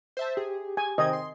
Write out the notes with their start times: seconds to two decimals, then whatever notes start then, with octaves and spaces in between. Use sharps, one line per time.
0.17 C5 E5 A5
0.37 G4 G#4
0.77 G#5
0.98 C3 D#3 C5 D#5 G5 G#6
1.13 C6